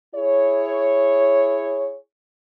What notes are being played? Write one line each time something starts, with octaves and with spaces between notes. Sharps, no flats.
E4 G#4 C#5